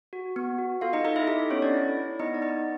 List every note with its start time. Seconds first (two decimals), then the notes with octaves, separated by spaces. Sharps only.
0.13 F#4
0.36 B3
0.58 F#4
0.81 F4 A4 F5
0.93 D#4 D#5
1.05 D#4 A4 D#5
1.16 E4 E5
1.27 D#4 G4 D#5
1.39 A4
1.50 B3 C#4 C#5
1.62 D4 D5
1.73 E4
1.97 E4
2.19 B3 D#4 D#5
2.34 D5
2.42 B3 D#4 D#5